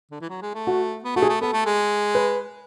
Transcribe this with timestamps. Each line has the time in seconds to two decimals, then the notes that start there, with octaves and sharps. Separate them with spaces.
0.11 D3
0.21 E3
0.30 F#3
0.42 G#3
0.54 A3
0.67 F#4
1.04 B3
1.16 A3 F#4
1.22 G#4
1.29 A3
1.42 B3 A4
1.53 A3
1.66 G#3
2.15 B4